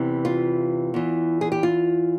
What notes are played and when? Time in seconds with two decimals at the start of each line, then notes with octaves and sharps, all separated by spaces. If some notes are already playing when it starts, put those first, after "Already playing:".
Already playing: E2 C3 E3
0.25 F4
0.94 E2 E3
1.41 G#4
1.52 G4
1.63 F4